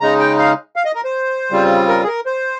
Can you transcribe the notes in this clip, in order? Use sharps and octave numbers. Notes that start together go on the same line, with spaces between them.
C#3 G#3 D#4 A#5
G5
F5
F5
D#5
A#4
C5
C#3 G3 C4 F4
A#4
G#4
A#4
C5